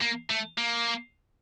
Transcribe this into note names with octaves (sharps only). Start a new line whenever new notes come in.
A#3
A3
A#3